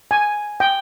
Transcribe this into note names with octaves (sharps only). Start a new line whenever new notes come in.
G#5
G5